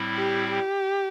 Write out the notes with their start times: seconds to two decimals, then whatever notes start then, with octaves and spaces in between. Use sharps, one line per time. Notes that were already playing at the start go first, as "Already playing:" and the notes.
Already playing: A2 G3 C4 E4
0.17 G4
0.52 G4